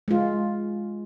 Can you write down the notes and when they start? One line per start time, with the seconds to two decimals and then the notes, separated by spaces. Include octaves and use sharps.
0.08 G#3 F4